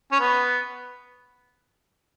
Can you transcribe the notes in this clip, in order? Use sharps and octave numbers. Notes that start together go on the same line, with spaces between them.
C#4
B3